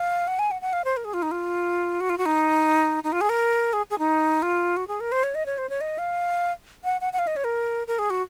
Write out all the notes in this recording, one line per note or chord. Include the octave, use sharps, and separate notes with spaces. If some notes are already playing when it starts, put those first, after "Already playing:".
Already playing: F5
F#5
G#5
F#5
F#5
F5
C5
A#4
G#4
F4
D#4
F4
F#4
F4
F#4
D#4
D#4
F4
G#4
A#4
G#4
G#4
D#4
F4
F#4
G#4
A#4
C5
C#5
D#5
C#5
C5
C#5
D#5
F5
F#5
F#5
F#5
F5
D#5
C#5
A#4
A#4
G#4
F#4